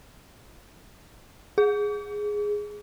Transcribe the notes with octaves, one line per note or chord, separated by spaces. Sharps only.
G#4